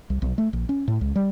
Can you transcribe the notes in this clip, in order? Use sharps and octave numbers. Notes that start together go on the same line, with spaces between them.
C2
B1
A3
A#1
C#4
A2
C#2
G3